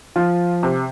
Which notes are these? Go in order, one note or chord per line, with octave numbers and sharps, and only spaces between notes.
F3 F4
C3